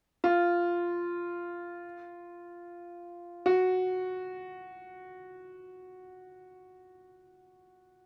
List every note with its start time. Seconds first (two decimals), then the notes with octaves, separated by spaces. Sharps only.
0.24 F4
3.46 F#4